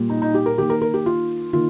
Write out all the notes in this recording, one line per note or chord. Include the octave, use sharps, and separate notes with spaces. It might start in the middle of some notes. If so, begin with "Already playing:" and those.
Already playing: A#2 G3 A#3
D#4
D#4
G4
A#4
D#3 A#3 G4
A#4
A#4
G4
F4
D#3 A#3 F4